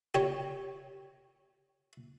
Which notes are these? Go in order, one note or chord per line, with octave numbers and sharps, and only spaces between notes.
G4 C#5